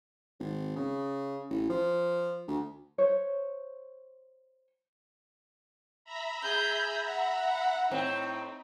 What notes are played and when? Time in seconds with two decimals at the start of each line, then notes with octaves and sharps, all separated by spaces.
0.40 G#1
0.76 C#3
1.50 A1
1.70 F3
2.47 D2
2.98 C5 C#5
6.05 E5 A#5 B5
6.43 G#4 G6
7.07 F#5
7.91 A2 C4 D#4